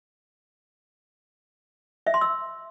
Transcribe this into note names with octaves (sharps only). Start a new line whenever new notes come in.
E5
C6
E6